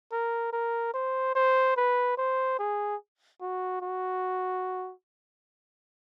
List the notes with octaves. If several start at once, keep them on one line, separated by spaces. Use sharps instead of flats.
A#4
A#4
C5
C5
B4
C5
G#4
F#4
F#4